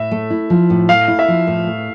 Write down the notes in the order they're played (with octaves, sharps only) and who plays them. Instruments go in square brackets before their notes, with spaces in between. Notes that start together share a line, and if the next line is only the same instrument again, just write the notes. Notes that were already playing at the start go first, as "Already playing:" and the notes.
Already playing: [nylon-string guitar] A2 [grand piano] E5
[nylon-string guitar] A3
E4
F3
A2
[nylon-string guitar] A3 [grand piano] F5
[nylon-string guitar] E4
[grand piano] E5
[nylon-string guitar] F3
A2
A3